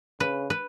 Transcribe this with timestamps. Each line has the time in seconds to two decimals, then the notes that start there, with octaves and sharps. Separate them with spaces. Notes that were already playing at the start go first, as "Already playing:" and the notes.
0.20 C#3 B4
0.50 B4